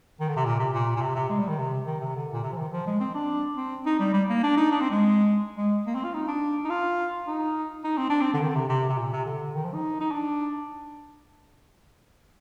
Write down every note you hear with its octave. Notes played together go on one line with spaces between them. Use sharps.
D#3
D3
C3
A#2
C3
A#2
A#2
C3
C3
G#3
G3
D#3
C3
D#3
C3
D3
A#2
C3
F3
D#3
F3
G#3
C4
D4
C4
D#4
G3
G3
A#3
D4
D#4
D4
C4
G#3
G#3
A#3
C4
F4
D#4
D4
D#4
F4
D#4
D#4
C4
D4
C4
D3
D#3
D3
C3
C3
C3
A#2
C3
D3
D#3
F3
D#4
D#4
D4